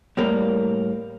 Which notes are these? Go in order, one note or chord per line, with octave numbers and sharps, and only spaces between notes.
A2 G3 A#3